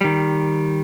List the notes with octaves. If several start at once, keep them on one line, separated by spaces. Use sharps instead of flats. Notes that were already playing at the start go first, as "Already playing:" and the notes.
D#3 G3